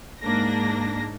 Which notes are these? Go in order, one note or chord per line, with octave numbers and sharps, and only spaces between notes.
G#2 A#3 D4 A#6